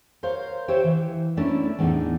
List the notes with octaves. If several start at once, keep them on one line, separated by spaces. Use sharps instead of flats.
A#4 C5 C#5 F5
G4 C5 C#5 E5 F5 G5
E3
A3 A#3 C#4 D4 E4
E2 A2 D4 D#4